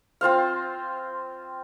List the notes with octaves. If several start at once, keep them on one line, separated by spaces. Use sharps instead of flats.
C4 F4 C5 F5